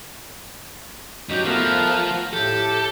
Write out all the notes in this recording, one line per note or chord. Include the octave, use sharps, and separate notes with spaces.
F#2 F#3 D#4 G4
F3 A3 B3 A#4
A2 G4 A4